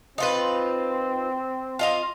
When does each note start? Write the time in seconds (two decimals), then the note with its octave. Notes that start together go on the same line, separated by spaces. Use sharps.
0.18 C4 D#4 F4 B4
1.79 F4 D#5 F5